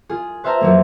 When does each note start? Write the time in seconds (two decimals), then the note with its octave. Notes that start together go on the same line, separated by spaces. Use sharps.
0.09 F4 G#4
0.44 B4 C5 E5 F5 A5 A#5
0.61 F2 F#3 A#3